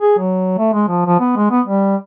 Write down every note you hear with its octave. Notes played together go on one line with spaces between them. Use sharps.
G#4
F#3
A3
G#3
F3
F3
B3
G#3
B3
G3